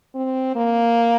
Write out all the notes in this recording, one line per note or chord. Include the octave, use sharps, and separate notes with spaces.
C4
A#3